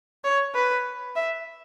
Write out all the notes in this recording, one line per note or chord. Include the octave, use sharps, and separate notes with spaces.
C#5
B4
E5